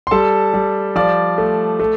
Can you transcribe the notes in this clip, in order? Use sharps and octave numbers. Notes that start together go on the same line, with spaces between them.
C6
G3 A4 A5
G3
F3 D5 D6
A3
A3